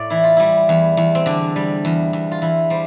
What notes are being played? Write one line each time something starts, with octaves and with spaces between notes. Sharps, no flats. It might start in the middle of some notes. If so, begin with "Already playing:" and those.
Already playing: A2 D5
E3 E4
F4
G3 E4
E2
E2
C4
D3 D4
G3
E2
E2
F4
E3 E4
G3 C5